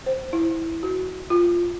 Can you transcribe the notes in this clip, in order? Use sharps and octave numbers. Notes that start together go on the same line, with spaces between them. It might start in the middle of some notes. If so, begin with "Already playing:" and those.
C5
E4
F#4
F4